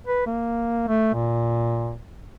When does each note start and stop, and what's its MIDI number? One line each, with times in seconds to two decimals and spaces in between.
0.07 0.23 71
0.26 0.87 58
0.88 1.11 57
1.14 1.96 46